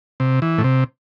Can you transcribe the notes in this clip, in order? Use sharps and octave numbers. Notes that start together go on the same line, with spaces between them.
C3
E3
A2
C3